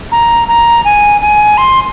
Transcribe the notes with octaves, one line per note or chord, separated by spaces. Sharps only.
A#5
A#5
G#5
G#5
C6